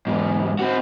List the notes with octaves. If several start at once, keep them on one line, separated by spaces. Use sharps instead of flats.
E2 G#2
C4 F#4